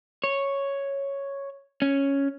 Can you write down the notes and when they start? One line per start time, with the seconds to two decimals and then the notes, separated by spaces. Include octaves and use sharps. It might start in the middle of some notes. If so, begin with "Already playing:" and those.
0.24 C#5
1.82 C#4